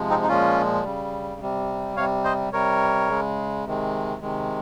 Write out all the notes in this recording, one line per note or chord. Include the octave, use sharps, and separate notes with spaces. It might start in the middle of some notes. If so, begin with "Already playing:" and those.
Already playing: C3 F3 G#3
C4 D#4
D#4
A#2 F3 G#3 C#4 F4
C#3 G3
C3 G3
C3 G3 C#5 F5
C5 D#5
C3 G3 A#4 C#5
C#3 G#3
C3 D#3 G#3
C3 D#3 G#3